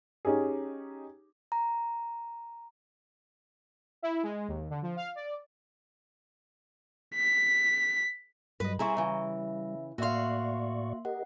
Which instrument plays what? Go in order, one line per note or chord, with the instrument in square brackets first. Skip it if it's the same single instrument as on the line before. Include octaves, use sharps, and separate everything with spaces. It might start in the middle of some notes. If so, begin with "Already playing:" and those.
[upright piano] C#4 D#4 G4 G#4
[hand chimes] A#5
[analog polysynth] E4
G#3
D#2
D3
F3
F5
D5
[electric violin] B6
[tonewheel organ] G2 F#3 G3 [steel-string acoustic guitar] B4 D#5
[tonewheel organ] G3 [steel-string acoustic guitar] C4 E4 G#4 [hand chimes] A#5 C#6
[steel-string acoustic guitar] C#3 E3 [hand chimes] E5
[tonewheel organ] A2 D5 C#6 [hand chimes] A#3 E5 C6 [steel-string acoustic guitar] F#4 F5
[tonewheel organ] G4 A#4 D#5 [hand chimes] F#5